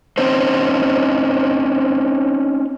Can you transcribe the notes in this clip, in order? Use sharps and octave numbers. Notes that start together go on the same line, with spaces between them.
C4 C#4 D#4 C5